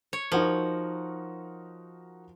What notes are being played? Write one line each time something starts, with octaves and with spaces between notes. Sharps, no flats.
C#5
F3 D#4 F#4 A#4